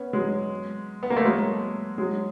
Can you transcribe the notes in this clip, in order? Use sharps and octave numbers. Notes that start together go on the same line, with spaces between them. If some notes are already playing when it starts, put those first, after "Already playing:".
Already playing: B3 C#4
F#3 G#3
B3
A#3
A3
F#3 G#3
F#3 G#3